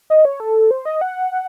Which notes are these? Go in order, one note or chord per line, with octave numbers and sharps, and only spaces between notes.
D#5
C#5
A4
C5
D#5
F#5